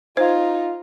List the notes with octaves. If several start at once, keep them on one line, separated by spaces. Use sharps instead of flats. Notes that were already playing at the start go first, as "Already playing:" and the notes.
D#4 F4 C5